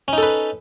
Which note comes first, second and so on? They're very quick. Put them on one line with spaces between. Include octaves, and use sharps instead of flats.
C#4 D#4 A4 B4